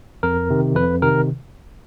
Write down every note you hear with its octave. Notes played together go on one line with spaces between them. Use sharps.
F2 A#4
C3 D#3
F2 B4
C3 D#3 A#4